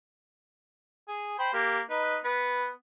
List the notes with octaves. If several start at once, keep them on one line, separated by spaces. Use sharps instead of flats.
G#4
C5 G5 B5
A#3 G4
D#4 B4
B3 B4